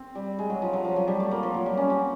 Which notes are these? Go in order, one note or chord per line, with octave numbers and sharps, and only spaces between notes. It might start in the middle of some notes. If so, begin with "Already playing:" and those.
Already playing: C4
G3
G#3
F#3
F3
F#3
F3
F#3
G3
A3
A#3
F3
F#3
G3
C#4
C4